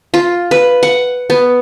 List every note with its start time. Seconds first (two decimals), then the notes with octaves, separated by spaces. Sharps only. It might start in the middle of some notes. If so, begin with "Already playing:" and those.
0.14 F4
0.51 B4
0.83 F#5
1.30 B3